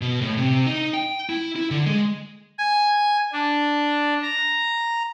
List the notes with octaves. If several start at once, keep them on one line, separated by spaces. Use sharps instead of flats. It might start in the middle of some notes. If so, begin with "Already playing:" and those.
B2
A2
C3
D#4
G5
E4
E4
D3
G#3
G#5
D4
A#5